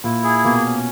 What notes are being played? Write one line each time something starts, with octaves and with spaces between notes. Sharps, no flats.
A#2 E4
G#4
B2 A#3
C#4